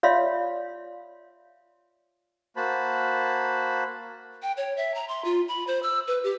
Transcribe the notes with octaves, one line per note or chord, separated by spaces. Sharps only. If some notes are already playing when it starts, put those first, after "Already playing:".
F4 C#5 D5 E5 F5 C6
A#3 F#4 C5 A5 B5
G5
C#5
E5
A#5
C6
F4
B5
C5
E6
B4
G4